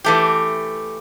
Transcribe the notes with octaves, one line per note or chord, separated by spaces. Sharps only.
E3 A3 G4